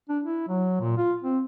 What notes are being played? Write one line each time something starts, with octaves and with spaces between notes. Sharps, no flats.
D4
E4
F#3
A#2
F4
C4